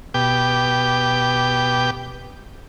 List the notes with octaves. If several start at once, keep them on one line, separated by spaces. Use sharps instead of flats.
B2 G4 G5 D6